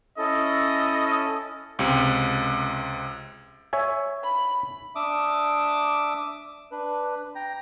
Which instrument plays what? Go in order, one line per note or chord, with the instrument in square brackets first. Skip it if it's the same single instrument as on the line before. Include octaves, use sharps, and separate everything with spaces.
[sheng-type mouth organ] C#4 E4 A4 [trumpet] D#5
[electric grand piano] C#2 C3
[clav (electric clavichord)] C#5 E5 G#5
[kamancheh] B5
[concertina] D4 E5 D6 D#6
D4 B4
G5 A#5